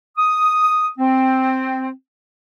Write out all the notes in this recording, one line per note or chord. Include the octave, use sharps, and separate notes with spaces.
D#6
C4